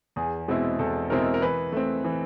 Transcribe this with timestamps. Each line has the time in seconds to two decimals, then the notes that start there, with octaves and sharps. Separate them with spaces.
0.16 E2 G#4
0.48 B2 G#3 C4 E4
0.79 E2 A4
1.10 B2 G#3 C4 E4 A#4
1.34 A#4
1.41 E3 B4
1.73 A3 C4
2.04 E3